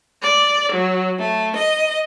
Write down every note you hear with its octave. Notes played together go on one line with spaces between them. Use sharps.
D5
F#3
A3
D#5